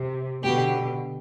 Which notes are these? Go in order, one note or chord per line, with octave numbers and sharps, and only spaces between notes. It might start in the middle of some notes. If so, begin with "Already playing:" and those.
Already playing: C3
B2 D3 G4